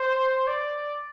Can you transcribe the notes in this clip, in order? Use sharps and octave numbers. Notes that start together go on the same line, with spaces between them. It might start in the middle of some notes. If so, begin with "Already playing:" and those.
Already playing: C5
D5